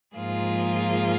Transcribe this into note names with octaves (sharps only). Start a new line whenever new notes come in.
G#2 F3 A#3 F4 G#4